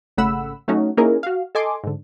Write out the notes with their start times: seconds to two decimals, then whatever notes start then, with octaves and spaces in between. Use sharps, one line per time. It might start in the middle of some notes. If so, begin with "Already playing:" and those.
0.17 G#1 C#3 A3 F#5 B5 E6
0.68 F#3 A3 C#4 D#4 F#4
0.97 A#3 C#4 D#4 E4 G#4 A#4
1.23 F#4 F5
1.55 A4 D#5 G#5 C6 D6
1.84 G#2 D3